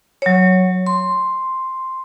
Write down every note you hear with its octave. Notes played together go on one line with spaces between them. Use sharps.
F#3 C#5
C6